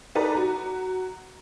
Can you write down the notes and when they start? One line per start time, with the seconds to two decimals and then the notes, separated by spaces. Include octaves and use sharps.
0.15 D#4 A4 B4 D5 A#5
0.34 F#4 A#5